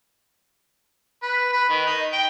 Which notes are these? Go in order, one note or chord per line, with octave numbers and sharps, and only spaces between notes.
B4
B4
D#3
D#4
G5